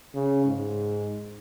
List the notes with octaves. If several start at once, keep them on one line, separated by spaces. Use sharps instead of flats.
C#3
G#2